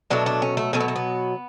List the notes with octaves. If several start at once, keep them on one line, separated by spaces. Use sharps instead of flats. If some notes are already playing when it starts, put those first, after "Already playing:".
B2 F#3 A3 D4
D4
C#4
A3
B2 F#3 A3 C#4
B3
A3
B3